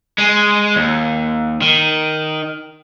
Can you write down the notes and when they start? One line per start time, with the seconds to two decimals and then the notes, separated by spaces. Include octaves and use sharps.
0.18 G#3
0.76 D#2
1.62 D#3